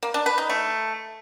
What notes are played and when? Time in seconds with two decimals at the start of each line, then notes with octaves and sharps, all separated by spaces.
0.03 A#3
0.14 D4
0.26 B4
0.38 D#4
0.49 A3